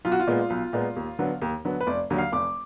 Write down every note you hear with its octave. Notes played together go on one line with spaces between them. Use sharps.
B1 F4
F#4
F4
A#2 G#3 B3
B1
A#2 G#3 B3
D#2
D3 F#3 B3
D#2
D3 F#3 B3
B4
F1 D5
D#2 D3 F#3
F5
F1 D6